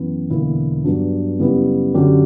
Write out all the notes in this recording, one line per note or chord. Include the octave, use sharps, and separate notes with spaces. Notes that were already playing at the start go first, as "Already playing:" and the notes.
Already playing: F#2 E3 B3 E4
E1 E2 D3 A#3 E4
G2 F#3 B3 D4
F#2 C#3 G3 B3 E4
F#2 D3 F#3 C#4 G4